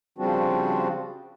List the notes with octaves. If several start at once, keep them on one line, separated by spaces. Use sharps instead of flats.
C#3 F3 G3 C4 D4 F#4